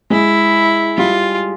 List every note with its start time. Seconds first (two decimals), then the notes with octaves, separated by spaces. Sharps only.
0.10 G#3 E4
0.97 G3 F4